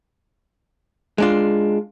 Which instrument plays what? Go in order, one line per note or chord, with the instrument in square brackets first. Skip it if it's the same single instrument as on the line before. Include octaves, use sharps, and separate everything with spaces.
[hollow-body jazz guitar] G#3 D4 F4